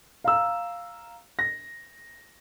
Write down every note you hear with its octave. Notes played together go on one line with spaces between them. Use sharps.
F5 A#5 E6
A#6